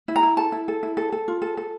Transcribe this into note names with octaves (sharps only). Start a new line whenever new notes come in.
E4
A#5
E4
A4 A5
E4
A4
E4
A4
A4
F4
A4
A4